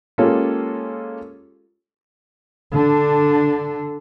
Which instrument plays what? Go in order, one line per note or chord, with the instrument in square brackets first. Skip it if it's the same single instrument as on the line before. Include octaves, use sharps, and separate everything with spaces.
[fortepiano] G#3 A#3 C#4 F4 G4 A4
[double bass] D3 D4